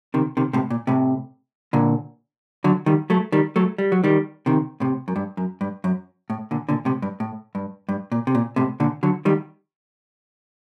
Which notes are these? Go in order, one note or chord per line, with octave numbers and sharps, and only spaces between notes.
C3 D#3
C3 D#3
A2 C3
A#2
A2 C3
A#2 D3
D3 F#3
D#3 G3
F#3 A3
D#3 G3
F#3 A3
G3
F#3
D#3 G3
C3 D#3
A2 C3
F#2
G2
F#2
G2
F#2
A2
A#2 D3
A#2 D3
A2 C3
G2
A2
G2
G2
A#2
C3
A#2
A2 C3
A#2 D3
D3 F#3
D#3 G3